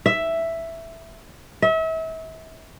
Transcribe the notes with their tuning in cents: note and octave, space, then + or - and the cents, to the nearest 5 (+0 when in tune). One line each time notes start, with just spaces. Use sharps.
E5 +5
E5 -35